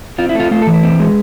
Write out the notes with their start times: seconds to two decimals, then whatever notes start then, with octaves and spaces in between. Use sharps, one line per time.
0.18 C4 F4
0.29 E4
0.35 A3 F4
0.51 A3 F4
0.62 A4
0.67 E3
0.73 B4
0.83 C4
1.00 G#3